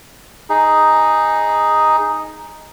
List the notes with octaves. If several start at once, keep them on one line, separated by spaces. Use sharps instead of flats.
D#4 G#4